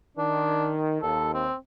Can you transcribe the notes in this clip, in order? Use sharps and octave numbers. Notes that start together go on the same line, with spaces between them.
D#3 D4
D#2 A4
C4